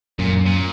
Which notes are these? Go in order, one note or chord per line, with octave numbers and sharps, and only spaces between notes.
F#2 A#2
A#2